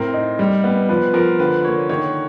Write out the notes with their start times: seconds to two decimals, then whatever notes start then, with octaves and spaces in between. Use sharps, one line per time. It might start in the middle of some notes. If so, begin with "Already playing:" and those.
Already playing: A2 C4 A#4
0.14 D#4
0.39 G3
0.64 B3
0.89 F3 B4
1.14 F3 A#4
1.39 D3 B4
1.64 A#3 C#5
1.89 D#3 C#5